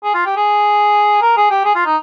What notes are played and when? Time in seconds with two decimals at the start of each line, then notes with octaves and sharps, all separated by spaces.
0.04 G#4
0.14 F4
0.26 G4
0.36 G#4
1.22 A#4
1.37 G#4
1.50 G4
1.65 G#4
1.75 F4
1.86 D#4